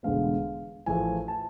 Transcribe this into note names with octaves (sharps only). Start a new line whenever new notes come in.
E1 E2 D3 G#3 B3 F5
A1 A2 F3 A3 G#5
A5